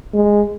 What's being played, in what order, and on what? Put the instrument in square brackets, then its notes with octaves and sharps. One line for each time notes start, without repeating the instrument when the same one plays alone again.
[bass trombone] G#3